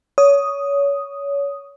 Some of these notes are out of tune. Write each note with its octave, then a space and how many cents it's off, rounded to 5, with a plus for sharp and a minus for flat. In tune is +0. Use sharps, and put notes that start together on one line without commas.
C#5 +25 D#6 +0